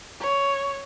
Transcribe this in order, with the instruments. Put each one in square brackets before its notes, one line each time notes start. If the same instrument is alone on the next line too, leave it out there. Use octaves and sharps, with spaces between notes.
[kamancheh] C#5